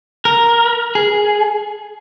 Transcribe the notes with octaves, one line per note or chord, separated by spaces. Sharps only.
A#4
G#4